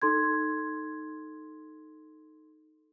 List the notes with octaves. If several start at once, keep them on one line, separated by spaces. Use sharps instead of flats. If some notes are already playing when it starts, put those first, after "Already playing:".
D#4 A4 C6 G#6